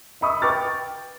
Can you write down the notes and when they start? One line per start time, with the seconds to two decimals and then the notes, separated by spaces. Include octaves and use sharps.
0.21 D#5 E5 B5 C#6 D#6 E6
0.42 B4 G5 C#6 D6 F6 A6
0.66 G5